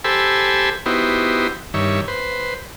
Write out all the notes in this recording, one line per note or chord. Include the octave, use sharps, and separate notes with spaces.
G4 A4 C5 G#5 B5 E6
B3 D#4 E4 F#4 G4 C5
G2 D#3 C#5 E5
B4 C5